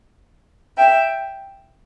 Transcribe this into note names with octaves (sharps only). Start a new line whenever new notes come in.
E5 G5